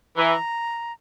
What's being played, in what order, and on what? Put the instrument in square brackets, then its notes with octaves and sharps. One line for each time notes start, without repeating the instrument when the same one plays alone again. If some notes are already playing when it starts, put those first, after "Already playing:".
[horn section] E3 [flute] A#5